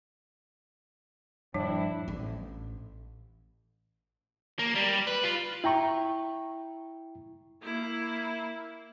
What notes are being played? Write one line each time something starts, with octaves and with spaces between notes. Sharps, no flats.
D#1 G2 F3 C4 D4 E4
A1
A#3
G3
B4
F4
E4 G5 A#5 C#6
A#3 E4